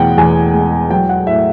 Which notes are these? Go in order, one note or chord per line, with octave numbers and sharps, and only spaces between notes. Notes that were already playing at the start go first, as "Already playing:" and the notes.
Already playing: E2 B2 F#5 G5
E2 G#5
G#3
F#3 G5
F#5
A2 E5